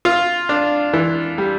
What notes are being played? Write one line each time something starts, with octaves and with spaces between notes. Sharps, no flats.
F4
D4
E3
G3